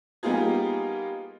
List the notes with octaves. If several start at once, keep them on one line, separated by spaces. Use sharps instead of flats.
G3 A#3 B3 D#4 F4 G#4